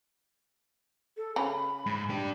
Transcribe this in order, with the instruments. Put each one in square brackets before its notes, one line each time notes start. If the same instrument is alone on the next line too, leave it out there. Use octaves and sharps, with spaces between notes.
[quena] A4
[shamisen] C#3 A#5 [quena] B5
[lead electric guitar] G#2
D4 G4